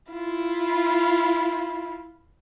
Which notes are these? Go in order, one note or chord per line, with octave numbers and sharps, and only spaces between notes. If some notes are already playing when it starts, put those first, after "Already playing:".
E4 F4